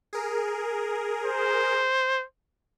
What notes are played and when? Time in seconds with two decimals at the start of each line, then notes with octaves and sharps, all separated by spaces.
0.13 G#4 A#4
1.26 C5